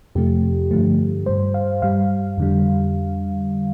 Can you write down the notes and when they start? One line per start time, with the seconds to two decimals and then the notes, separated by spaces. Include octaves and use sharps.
0.15 F2 C3 F3 A3 G4
0.71 G2 D3 F3 A3
1.26 G2 G3 C5
1.54 F5
1.82 G2 G3 F5
2.38 F2 D3 G3